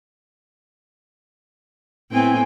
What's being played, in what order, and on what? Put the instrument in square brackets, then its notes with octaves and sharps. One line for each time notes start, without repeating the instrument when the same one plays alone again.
[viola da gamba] A2 B3 C4 [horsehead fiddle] G5 G#5